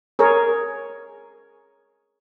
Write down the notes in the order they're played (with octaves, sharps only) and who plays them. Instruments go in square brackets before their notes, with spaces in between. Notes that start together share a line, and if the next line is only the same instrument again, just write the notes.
[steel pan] G#4 A#4 C#5